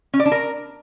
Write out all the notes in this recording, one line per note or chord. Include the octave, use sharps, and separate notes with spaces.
C#4
D5
D4
A#4